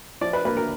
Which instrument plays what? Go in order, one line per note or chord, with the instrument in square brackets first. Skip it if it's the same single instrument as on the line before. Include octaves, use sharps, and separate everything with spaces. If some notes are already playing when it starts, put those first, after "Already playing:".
[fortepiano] F3 D5
B4
A#3 B4
A#4